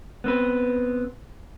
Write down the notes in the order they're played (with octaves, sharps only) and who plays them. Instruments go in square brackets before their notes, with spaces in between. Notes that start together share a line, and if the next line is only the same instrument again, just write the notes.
[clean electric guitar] B3 C4 B4